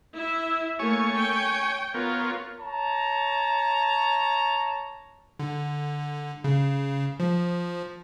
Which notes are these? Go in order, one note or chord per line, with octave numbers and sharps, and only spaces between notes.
E4 E5
A3 A#3 C#5 G#5 C#6
G5
B3 F4 A#4 C#5
C#5 A5 A#5
D3
C#3
F3